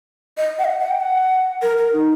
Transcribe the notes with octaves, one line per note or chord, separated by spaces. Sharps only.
D#5
F#5
D#5
F#5
F#5
G5
F#5
A#4
A#4
D#4